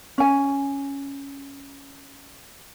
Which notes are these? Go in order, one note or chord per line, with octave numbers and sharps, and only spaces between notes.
C#4 G#5